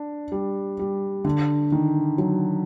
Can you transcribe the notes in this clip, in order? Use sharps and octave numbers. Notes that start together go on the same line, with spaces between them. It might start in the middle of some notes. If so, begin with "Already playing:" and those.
Already playing: D4
G3
G3
D3
D#3
F#3